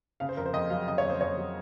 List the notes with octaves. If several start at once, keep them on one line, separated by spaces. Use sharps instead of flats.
C#3 F5
C5
F2 A#4
C5
F2 D#5
F#3 F5
C#3 D#5
C#5
F2
C5
F2 C#5
F#3